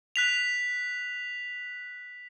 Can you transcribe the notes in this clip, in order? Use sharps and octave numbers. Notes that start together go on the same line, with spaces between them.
F#6 B6 F7